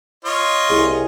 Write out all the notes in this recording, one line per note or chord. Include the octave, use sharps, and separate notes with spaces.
F4 C#5 D#5
C2 G#4